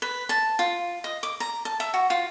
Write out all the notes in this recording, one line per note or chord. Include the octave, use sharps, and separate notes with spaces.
B4
A5
F4
D#5
D6
A#5
A5
E5
F#4
F4